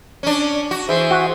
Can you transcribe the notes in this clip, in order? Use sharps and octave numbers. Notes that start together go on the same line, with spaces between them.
C#4 D4
F#4
E3 G#4 C5 E5
F#4